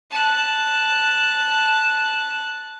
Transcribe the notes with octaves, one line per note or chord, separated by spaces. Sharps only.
A5 F#6